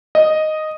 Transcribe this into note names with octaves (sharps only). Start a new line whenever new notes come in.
D#5